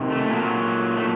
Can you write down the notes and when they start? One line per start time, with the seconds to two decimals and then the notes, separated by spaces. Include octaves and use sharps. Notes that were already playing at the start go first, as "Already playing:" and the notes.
Already playing: C3 D#3 F#3
0.10 A3
0.29 A#2 F#3
0.97 A3